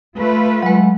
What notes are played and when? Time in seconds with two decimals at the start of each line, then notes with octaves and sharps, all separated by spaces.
0.16 A3 F4 B4
0.63 F#3 G#3